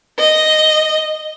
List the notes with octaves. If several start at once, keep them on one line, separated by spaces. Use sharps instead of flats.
D#5